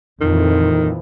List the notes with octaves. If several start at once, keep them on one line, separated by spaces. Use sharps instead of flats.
F2 A#2 D#3 E3